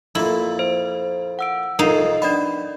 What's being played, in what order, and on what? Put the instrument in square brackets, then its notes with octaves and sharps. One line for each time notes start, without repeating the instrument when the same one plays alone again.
[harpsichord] F2 A#2 A#3 [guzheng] E4
[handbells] C5
F#5 E6 D7
[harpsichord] C2 F2 [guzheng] D#4 [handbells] A#4 C7
[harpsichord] B3 [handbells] D4 D5 B5